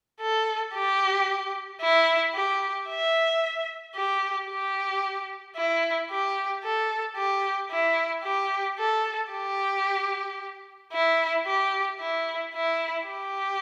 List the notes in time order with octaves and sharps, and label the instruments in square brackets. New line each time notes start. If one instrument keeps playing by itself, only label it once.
[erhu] A4
G4
E4
G4
E5
G4
G4
E4
G4
A4
G4
E4
G4
A4
G4
E4
G4
E4
E4
G4